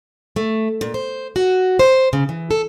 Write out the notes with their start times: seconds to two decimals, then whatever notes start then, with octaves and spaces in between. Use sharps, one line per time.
0.36 A3
0.81 A#2
0.94 C5
1.36 F#4
1.79 C5
2.13 C#3
2.29 E3
2.51 A4